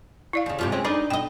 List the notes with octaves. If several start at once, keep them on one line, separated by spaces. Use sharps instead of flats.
E4 D5 F5
D#2 C#3
G#2 C3 F3
G#3 C4 C#4
D4 D#4 A#4 D5
B2 D#5 G5